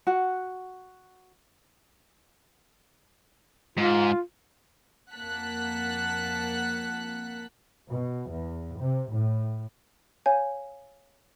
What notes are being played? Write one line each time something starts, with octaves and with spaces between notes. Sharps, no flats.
F#4 F#5
G#2 F4
F2 A#3 F#5 A5 F#6 B6
B2
E2
C3
A2
C#5 F5 G#5 G6